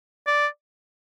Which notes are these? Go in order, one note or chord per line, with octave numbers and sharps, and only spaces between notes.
D5